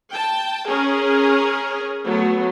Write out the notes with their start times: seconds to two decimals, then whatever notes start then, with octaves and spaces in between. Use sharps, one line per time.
0.12 G5 A5
0.67 C#4 G#4 A#4
2.04 F#3 A3 B3